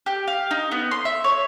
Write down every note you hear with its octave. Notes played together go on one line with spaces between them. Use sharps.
G4
F5
D#4
B3
C6
E5
C#5